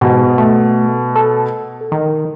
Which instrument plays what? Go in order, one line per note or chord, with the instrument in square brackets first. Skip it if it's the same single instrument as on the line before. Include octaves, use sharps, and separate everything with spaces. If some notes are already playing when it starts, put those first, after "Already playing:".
[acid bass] G#2 [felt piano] B2
[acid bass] A3
A4
D#3